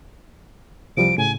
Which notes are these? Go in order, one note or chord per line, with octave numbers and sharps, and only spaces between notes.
C2 F3 G3 D7
A2 C#3 G#5